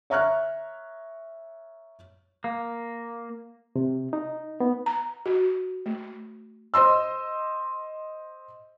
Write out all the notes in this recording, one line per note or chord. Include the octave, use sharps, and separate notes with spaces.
C#5 E5 A#5 C#6 F6 F#6
A#3
C3
D#4
B3
A#5
F#4
A3
C5 D#5 C6 E6